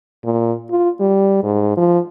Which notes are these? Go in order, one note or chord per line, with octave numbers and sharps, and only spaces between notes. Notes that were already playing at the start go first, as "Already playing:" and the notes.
A#2
F4
G3
G#2
F3